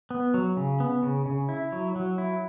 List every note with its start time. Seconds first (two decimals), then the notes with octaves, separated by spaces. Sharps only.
0.10 B3
0.34 F#3
0.57 C#3
0.80 B3
1.03 C#3
1.26 C#3
1.49 E4
1.72 F#3
1.96 F#3
2.18 E4